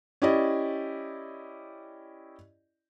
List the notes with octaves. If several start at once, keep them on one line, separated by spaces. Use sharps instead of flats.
C#4 E4 G4 D5 D#5